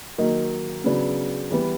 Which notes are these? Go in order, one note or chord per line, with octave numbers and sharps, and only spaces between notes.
D#3 F#3 A#3 D#4
C#3 F#3 B3 D4
E3 G3 B3